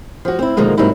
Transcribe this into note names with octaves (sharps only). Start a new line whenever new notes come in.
F3 F#4
C4 E4
B2 D3 D#3 F3 G#3 A#3
G#2 C3 F#3 A#3 D#4 E4